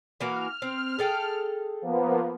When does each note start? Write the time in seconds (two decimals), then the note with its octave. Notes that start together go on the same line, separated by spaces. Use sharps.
0.20 E3 A#3 F#4 F6
0.62 C4
0.99 G#4 A4 G5
1.82 F3 A#3 B3